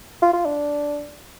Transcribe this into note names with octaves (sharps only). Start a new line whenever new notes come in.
F4
F4
D4